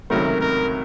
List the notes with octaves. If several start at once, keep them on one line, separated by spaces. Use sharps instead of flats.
C#2 C3 D#3 F#3 A3 A#4
A#4